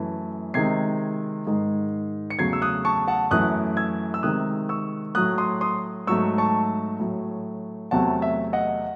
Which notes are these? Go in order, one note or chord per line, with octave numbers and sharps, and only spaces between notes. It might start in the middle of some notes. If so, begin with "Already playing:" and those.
Already playing: F#2 E3 A3 A5
C3 D#3 G#3 G#6 C7
G#2 D#3 G#3
C#7
E2 C#3 F#3 A3 G#6 C7
E6
D#6 F#6
A5 C#6
F#5 A5
F#2 E3 A3 D#6 F#6
E6 G#6
E6
C3 D#3 G#3 D#6 F#6
C#6 E6
A2 F#3 A3 D#6 F#6
C6 D#6
C6 D#6
G#2 F#3 A3 C#6 E6
A5 C#6
A2 F#3 A3
E2 C3 F#3 A3 F#5 A5
E5
D#5 F#5